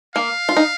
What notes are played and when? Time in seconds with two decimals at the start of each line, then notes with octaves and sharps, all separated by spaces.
0.15 A#3 F5
0.49 F4
0.57 D#4